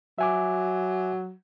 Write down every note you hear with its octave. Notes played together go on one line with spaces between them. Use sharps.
F#3 E5 G#5 D6